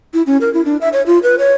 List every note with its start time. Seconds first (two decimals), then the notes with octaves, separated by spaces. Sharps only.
0.14 E4
0.26 C#4
0.41 A#4
0.54 E4
0.65 D4
0.81 E5
0.93 C#5
1.06 F4
1.23 B4
1.39 C#5